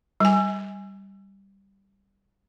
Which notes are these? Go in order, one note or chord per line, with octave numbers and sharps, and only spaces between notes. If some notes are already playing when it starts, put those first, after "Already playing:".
G3 G#5